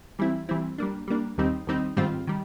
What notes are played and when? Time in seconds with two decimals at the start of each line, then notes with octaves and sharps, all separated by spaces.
0.19 E3 G3 C4 E4
0.49 E3 G3 C4 E4
0.78 G3 A#3 D4
1.08 G3 A#3 D4
1.38 D#2 D#3 G3 C4 D#4
1.67 D#2 D#3 G3 C4 D#4
1.97 G#2 D#3 G3 C4 F4
2.27 D#3 G3